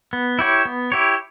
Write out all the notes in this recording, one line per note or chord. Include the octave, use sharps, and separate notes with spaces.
B3
E4 G4 C#5
B3
E4 G4 C#5